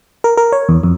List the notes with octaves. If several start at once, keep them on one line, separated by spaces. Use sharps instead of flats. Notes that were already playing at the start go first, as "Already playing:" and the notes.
A#4
A#4
C#5
E2
F2